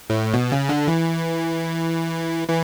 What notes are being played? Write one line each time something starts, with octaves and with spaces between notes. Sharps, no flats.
A2
B2
C#3
D3
E3
E3